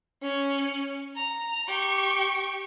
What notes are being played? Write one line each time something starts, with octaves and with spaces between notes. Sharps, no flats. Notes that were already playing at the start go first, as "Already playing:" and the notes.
C#4
A#5
G4 C#6